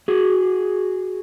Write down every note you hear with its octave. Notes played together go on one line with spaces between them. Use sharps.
F#4 G#4